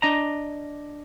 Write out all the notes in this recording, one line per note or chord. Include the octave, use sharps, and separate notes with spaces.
D4 D#5 A#5